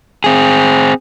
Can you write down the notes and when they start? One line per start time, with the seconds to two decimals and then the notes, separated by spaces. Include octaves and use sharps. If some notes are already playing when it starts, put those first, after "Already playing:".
0.24 C4 G#4